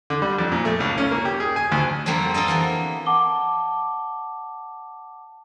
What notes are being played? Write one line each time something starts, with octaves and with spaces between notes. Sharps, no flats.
D3
G3
F2
A#2
A3
C#2
C#4
A#3
G4
G#4
G#5
D2
F2 D3 G3 A#3 C4
F4 A4 A#4 D#5
E3 A#3 B3
F#5 A5 D6 G7